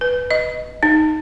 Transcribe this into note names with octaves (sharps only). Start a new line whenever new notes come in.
B4
D#5
D#4